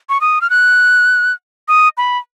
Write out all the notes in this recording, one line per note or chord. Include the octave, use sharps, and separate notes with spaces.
C#6
D#6
F6
F#6
D#6
B5